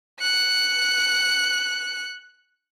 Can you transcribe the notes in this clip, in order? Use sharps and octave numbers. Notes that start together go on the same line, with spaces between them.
F#6 C#7